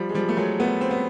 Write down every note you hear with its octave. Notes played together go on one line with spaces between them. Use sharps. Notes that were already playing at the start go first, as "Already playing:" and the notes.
Already playing: F3 G3
G#3
F3 G3
A3
F#3 G#3
A3 B3
C4
B3